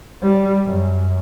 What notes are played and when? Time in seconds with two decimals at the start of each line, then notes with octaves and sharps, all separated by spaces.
0.22 G3
0.66 F#2